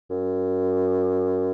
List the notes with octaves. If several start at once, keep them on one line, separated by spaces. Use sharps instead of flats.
F#2